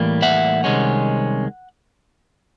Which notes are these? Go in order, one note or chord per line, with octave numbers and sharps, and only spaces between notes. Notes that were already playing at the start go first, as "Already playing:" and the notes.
Already playing: A2 E3 G3 A#3
E5 F#5
C2 C3 D#3 G#3 C#4